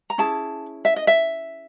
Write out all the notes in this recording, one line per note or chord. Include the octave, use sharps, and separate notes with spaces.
A#5
C#4 E4 G#4 A5
E5
D#5
E5